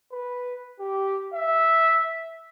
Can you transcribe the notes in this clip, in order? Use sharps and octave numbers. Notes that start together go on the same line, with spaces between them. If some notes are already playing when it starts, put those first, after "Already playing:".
B4
G4
E5